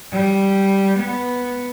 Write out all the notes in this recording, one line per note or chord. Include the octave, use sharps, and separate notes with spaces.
G3
B3